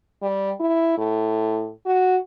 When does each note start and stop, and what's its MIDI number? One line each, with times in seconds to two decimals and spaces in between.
0.22 0.52 55
0.60 0.97 64
0.98 1.71 45
1.86 2.17 66